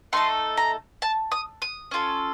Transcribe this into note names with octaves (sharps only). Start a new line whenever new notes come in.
A3 D#4 A4 C6
A#5
A5
D#6
D#6
C#4 F4 A4